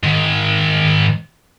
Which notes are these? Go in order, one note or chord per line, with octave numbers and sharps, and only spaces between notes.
G#2 D#3